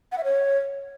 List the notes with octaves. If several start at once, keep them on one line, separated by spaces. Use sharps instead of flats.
F#5
E5
C#5